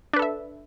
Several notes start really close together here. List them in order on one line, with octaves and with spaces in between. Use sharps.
D4 B4 A4 E5